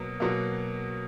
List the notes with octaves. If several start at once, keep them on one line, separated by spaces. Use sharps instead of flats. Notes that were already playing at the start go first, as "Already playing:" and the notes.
Already playing: B2 F#3 A#3
B2 F#3 A#3